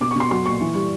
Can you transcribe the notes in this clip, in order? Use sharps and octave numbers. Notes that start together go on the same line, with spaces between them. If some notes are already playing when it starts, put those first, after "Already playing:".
B2 D6
C#6
B2 C6
F#3 C6
A#2 C#6
E3
G3